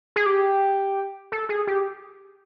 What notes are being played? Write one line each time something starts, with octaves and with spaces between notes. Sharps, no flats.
G#4
G4
A4
G#4
G4